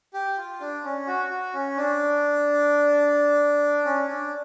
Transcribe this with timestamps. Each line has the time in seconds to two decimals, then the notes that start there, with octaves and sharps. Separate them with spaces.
0.14 G4
0.38 F4
0.61 D4
0.84 C#4
1.07 F#4
1.30 F#4
1.54 C#4
1.77 D4
3.85 C#4
4.08 D4